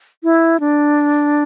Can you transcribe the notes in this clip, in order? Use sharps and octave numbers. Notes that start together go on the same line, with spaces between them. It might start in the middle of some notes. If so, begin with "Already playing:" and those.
E4
D4